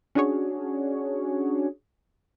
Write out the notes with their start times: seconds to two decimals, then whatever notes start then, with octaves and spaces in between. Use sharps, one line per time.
0.15 C#4 D4 F#4 G#4 C#5